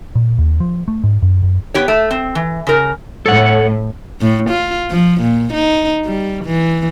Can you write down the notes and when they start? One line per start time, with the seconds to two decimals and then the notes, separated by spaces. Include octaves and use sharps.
0.15 A#2
0.38 D#2
0.60 F3
0.88 A3
1.04 G#2
1.22 F#2
1.43 F#2
1.74 B3 G4 C#5
1.88 A3
2.11 C4
2.35 E3
2.67 C#3 A#4
3.26 A2 A4 C#5 F#5
4.21 A2
4.50 F4
4.91 F3
5.21 A#2
5.53 D#4
6.05 G3
6.45 E3